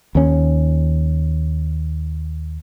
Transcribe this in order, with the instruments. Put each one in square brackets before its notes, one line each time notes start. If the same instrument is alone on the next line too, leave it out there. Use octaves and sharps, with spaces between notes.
[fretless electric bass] D#2 C#4